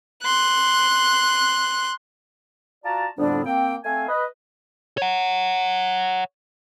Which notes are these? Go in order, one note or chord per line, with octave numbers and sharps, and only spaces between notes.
C6 F#6
F4 F#4 D5 A5 A#5
F2 A2 D3 G3 B3 D4
A#3 C4 G5
A3 C4 F5 G#5
B4 D#5
C#5 F#5